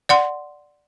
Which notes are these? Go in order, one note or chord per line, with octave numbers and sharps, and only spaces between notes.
D5 F#5 C6